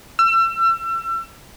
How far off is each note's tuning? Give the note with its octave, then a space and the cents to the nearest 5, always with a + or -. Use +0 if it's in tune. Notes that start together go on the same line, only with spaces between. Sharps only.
E6 +35